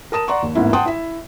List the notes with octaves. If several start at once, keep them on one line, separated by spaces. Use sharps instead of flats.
A#4 A5 D#6 E7
D5 F#5 A#5 C6 C#6
D#2
A1 E2 G#2 A#3 E4
F#5 G5 A5 C6 D#6
E4 E5